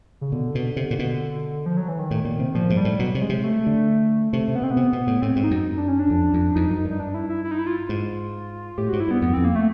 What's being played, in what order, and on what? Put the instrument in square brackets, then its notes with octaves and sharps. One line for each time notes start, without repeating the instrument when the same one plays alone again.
[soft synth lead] C#3
[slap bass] B2 [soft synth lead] D3
[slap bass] B2
C3
A#2
B2
[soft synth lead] F3
F#3
E3
D#3
[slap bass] A2
A#2
C3
[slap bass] A#2 [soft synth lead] F3
[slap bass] G#2
[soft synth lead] G3
[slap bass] A2
[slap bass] B2 [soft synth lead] F#3
[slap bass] C3
[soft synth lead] G#3
[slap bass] C3
[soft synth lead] A3
[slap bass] D3
[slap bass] C3 [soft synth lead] A3
[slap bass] C3
[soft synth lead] B3
[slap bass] B2 [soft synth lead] C4
[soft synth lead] B3
[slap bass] C3
B2
A2
[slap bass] A2 [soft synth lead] C4
[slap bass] G#2
[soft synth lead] D#4
[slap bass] F#2
[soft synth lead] D4
C#4
D4
[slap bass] F2
F2
[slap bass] F2 [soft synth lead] D#4
[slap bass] F#2
[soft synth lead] D#4
[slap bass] G2
[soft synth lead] D#4
D4
E4
E4
E4
D#4
E4
F4
[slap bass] G#2
[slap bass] A2 [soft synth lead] G4
[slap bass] G#2 [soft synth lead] F#4
[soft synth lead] E4
[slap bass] G2 [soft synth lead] B3
[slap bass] F2 [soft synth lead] B3
[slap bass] F2 [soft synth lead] C4
[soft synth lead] A#3
A3